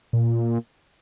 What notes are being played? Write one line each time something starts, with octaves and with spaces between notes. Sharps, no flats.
A#2